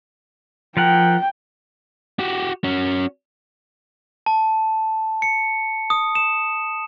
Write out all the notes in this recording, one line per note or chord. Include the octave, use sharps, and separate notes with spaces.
F3 A#4 F#5 G5
F#4 G4
C#4 F#4
A5
C#7
D#6
E7